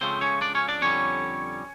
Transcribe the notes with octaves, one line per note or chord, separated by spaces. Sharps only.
C#2 C#3 F3 A3 C4 C5
C#4 C#5
D4 D5
C#4 C#5
D4 D5
F2 D3 G3 C#4 C#5